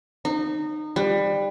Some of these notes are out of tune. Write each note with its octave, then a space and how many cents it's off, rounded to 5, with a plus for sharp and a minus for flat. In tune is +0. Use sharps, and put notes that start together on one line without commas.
D#4 -25
G3 +20